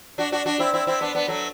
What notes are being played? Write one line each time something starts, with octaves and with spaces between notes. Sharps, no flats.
D4 F#4
D4 F#4
D4 F#4
C4 E4
C4 E4
C4 E4
B3 D4
B3 D4
F#3 A3